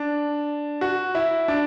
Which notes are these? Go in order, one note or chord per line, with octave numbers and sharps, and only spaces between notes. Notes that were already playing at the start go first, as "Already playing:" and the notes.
Already playing: D4
F#4
E4
D4